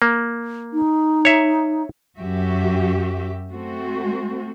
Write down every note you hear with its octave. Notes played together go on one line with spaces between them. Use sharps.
A#3
D#4
C#5 E5
F#2 F#4 G4 E5
A3 C4 F#4